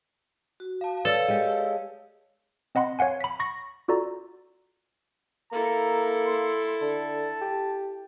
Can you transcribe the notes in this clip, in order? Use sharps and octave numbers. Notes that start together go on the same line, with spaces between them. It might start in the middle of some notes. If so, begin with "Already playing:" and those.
F#4
F5 A5
A4 B4 C#5 D5 F5 E6
G#3 G4
C4 D#5 F#5 B5 C6
C#5 F5 F#5 G#5
B5 B6
B5 C#6 A#6
F4 F#4 A4 D5 A#5
A#3 E4 A4 A#5
C6
D3 A5
G4